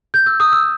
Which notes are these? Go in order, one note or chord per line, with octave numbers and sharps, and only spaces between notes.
G6
E6
D#6
E6